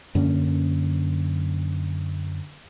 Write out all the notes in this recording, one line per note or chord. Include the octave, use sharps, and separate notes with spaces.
F#2 D3 A#3 C#4